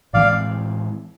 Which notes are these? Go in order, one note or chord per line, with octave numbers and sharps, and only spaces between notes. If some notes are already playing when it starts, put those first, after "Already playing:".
A2 E3 G#3 C4 D5 F5